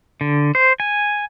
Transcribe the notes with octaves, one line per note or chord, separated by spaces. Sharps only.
D3
C5
G#5